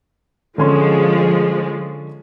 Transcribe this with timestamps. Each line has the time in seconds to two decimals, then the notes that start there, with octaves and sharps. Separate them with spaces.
0.58 D3 F3 G#3 C#4 C6